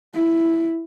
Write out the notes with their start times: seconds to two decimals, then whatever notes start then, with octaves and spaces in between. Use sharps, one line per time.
0.14 E4